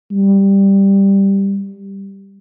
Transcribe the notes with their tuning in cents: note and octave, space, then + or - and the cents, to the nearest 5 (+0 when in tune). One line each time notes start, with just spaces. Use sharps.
G3 +5